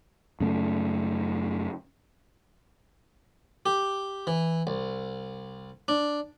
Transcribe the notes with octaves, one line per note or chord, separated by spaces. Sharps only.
F#2 C#3 A3
G4
E3
C2
D4